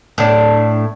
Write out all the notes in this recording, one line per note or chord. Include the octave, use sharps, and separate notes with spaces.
A2 D4